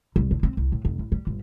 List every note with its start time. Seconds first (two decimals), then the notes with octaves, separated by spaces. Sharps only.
0.16 C2
0.31 D3
0.43 C4
0.57 C2
0.72 A2
0.85 F1
0.99 A1
1.12 G3
1.27 G1